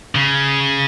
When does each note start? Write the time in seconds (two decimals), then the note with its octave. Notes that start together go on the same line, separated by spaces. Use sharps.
0.15 C#3